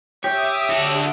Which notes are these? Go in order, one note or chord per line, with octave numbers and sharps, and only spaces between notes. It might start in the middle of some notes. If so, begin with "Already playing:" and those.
G4 C#5 E5 D6 D#6
D3 F#4 A4 D7